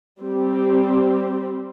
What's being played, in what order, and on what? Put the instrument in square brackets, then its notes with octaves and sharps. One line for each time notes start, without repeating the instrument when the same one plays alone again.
[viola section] G3 C4 G4